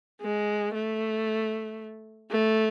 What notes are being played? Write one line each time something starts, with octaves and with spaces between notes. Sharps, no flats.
G#3
A3
A3